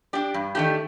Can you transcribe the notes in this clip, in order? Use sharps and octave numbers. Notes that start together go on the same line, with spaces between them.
D4 G4 D5
G2
D#3 A3 D4 G4